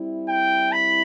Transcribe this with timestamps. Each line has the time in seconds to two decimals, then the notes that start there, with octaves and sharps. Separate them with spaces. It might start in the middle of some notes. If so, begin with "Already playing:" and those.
Already playing: G3 C4 E4
0.29 G5
0.72 B5